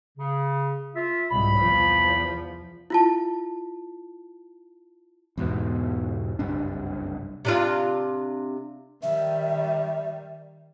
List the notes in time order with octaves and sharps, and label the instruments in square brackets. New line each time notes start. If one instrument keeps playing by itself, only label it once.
[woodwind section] C#3
F4 E5
[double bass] C2 G#2 [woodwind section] B5
[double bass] E2 F3
[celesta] E4 F4 A5
[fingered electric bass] E2 G#2 B2
F#1 C2 G2 D4
[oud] C3 D4 F4
[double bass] D#3 G3 [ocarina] E5